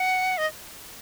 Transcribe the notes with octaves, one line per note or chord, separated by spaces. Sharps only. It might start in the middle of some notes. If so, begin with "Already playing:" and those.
Already playing: F#5
D#5